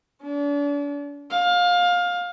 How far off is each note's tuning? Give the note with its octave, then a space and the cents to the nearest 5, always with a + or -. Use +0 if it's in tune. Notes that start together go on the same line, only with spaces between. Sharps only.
D4 -40
F5 +20